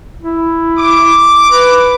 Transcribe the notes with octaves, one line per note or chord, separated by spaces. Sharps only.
E4
D6
B4